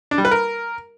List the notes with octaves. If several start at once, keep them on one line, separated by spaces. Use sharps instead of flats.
D4
G3
B4
A#4